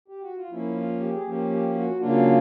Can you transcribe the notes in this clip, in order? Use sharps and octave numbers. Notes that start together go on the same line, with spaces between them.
G4
F#4
F4
F3 A#3 C#4 E4
F4
G4
G#4
F3 A#3 C#4 G4
G4
F#4
C#3 F#3 A#3 D4 F4